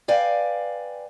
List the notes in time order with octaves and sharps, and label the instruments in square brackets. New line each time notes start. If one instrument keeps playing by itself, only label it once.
[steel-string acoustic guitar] B4 D5 F5 G5 G#5